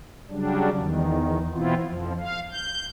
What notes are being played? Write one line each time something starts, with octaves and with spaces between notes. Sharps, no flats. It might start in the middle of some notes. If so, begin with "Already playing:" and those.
C#3 F#3 G3 D4
E2 D#3
B2 E3 B3 C4 E4 F4
F2 F3
F5
G6